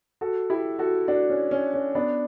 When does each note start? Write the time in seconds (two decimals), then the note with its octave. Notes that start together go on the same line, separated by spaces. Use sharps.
0.21 F#4 A4
0.50 E4 G4
0.79 F#4 A4
1.08 D4 F#4
1.30 C#4
1.51 C#4
1.74 C#4
1.95 B3 D4